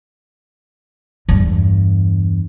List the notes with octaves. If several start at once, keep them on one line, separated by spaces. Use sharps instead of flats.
E2 G2